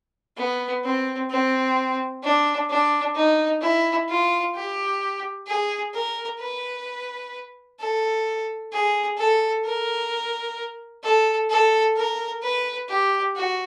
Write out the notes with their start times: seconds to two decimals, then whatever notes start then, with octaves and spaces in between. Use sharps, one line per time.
0.37 B3
0.84 C4
1.30 C4
2.24 D4
2.70 D4
3.15 D#4
3.62 E4
4.09 F4
4.55 G4
5.47 G#4
5.94 A#4
6.40 B4
7.80 A4
8.73 G#4
9.18 A4
9.65 A#4
11.03 A4
11.50 A4
11.97 A#4
12.42 B4
12.89 G4
13.36 F#4